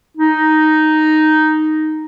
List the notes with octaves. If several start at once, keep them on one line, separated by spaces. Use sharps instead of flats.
D#4